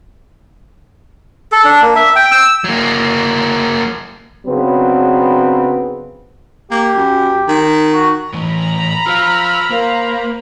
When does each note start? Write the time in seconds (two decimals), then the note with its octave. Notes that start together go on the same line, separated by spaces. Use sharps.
1.52 A4
1.65 D4
1.82 A#3
1.96 E5
2.16 G5
2.31 E6
2.64 F#3 A#3
4.46 C#3 F#3 B3 C4 D4 B4
6.71 A#3 G4
6.95 F#2
7.48 D#3
7.94 F#4
8.33 A2 E3 A#5 B5
9.07 F4 C5 F5 E6 F6
9.70 A#3 A#4 C5 F5